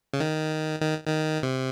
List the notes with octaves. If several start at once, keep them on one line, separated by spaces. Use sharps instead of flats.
C#3
D#3
D#3
D#3
C3